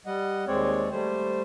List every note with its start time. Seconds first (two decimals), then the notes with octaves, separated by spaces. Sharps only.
0.06 G3 D#5 F#5
0.47 D#2 G#3 C4 C#5 D5
0.92 G3 A3 C5